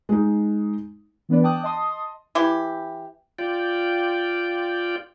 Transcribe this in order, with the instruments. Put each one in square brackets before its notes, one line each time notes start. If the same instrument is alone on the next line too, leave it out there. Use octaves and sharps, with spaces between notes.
[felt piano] G#3 D#4
[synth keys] E3 B3 D4 B4 D5
G5 A5 D6 D#6 F#6
D#5 A5 C6 D#6
[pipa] E3 E4 G4
[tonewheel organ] F4 D5 G5